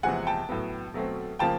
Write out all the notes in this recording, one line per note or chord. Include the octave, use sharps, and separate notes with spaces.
E2 C3 F3 G#3 F#5 G#5
G5 A5
A2 F#3 B3
B2 F#3 A3 C4
C#3 F3 A#3 G5 A5